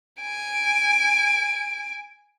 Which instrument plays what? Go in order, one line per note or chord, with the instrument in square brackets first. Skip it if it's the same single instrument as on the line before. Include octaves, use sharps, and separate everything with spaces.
[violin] G#5 D7